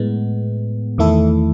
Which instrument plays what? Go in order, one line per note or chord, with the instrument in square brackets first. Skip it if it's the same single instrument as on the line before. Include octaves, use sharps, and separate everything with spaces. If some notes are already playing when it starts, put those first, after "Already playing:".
Already playing: [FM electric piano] A2 G#3 B3
E2 D#3 A3 E4 A4